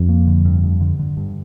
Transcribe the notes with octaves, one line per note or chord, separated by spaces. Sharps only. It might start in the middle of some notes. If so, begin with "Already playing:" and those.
Already playing: F2
A#3
D3
G2
G2
D3
D3
G2